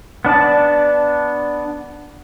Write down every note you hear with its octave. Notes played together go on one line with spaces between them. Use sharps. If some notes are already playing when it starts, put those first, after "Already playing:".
B3 D4 D5 A5